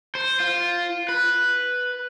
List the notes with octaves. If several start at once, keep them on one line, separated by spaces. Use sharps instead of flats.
C5
F4
B4